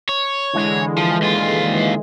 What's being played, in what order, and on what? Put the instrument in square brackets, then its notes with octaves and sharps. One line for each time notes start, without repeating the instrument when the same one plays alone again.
[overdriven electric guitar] C#5
[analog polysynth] D3 E3 G#3
[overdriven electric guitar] F3
D#2 F4